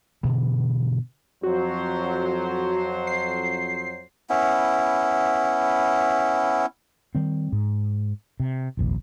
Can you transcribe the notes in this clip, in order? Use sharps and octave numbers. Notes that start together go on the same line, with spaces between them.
G2 B2 D3 E3
F2 F#3 F#4 C5
C7
B3 C#4 E4
D#3 G3 C4
G#2
C3
F1 A#1 D#2